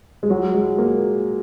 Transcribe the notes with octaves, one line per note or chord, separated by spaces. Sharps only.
G#3
F#3
G#3
A#3